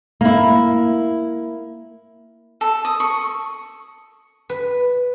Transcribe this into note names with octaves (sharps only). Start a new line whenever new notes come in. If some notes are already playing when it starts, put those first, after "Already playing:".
A#3 E4
A4
D#6
C#6
B4